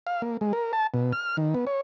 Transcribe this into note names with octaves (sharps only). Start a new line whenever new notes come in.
F5
A#3
G#3
A#4
A5
B2
F6
D#3
B3
C#5